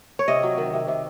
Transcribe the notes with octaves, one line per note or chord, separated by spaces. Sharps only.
C#5
C3 D#5
F#3
D#3
C3
C3